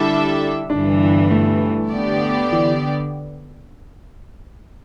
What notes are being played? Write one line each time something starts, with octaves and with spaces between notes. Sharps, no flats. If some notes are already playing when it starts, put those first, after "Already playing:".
Already playing: D3 G3 D4 E4 A4 E5
G1 G2 E3 D4
A3
D3 B3 G4 D5
E3